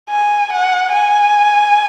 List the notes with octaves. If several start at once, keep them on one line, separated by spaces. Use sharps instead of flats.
G#5
F#5
G#5